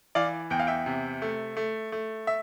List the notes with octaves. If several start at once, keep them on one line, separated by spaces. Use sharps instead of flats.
E3 D5 F5
E2 G5
F5
E5 G5
C3
A3
A3
A3
E5